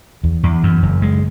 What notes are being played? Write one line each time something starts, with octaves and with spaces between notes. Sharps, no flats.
E2
E2
F#2
F#1
G#3